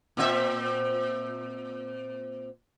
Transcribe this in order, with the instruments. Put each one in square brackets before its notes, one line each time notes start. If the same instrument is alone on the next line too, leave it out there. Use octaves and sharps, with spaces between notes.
[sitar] A#2 C4 E5